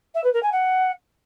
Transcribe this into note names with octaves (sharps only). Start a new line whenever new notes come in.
E5
B4
A#4
G#5
F#5